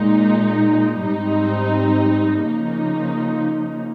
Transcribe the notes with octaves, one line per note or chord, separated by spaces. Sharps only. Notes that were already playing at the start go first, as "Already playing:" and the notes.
Already playing: A#2 G#3 D#4
G#2 G3 C4 D#4
C#3 F3 A#3 D#4